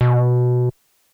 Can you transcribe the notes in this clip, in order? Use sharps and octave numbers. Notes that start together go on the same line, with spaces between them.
B2